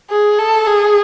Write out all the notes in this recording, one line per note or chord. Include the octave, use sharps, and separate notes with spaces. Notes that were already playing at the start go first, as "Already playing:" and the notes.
G#4
A4
G#4